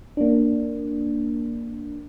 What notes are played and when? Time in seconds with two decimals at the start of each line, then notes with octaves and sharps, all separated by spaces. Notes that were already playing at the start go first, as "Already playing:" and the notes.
0.17 A#3 D4